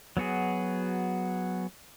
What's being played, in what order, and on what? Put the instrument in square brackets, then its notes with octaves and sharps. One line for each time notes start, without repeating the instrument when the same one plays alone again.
[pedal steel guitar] F#3 B3 F#4 G#4